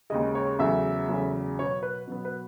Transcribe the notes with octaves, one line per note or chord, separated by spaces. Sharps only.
D#2 C#3 G#3 D#5
C#5
E2 C#3 F#3 A3 E5
E2 C#3 F#3 A3
B2 F#3 B3 C#5
B4
B2 F#3 B3
B4